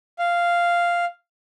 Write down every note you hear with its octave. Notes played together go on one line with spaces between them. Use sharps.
F5